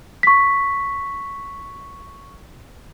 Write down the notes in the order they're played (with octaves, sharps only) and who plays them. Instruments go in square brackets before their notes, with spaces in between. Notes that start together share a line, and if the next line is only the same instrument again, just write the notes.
[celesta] C#6 B6